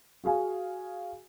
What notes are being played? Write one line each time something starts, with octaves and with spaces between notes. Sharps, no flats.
F#4 G#4 F5 G#5